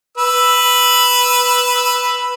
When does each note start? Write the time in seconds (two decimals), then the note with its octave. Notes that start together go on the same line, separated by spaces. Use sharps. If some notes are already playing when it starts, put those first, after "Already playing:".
0.18 B4 E6